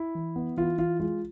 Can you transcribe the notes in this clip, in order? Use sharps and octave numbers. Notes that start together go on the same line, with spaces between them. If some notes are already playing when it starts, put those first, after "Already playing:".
Already playing: E4
E3
B3
E3 F4
E3 F4
G#3 F4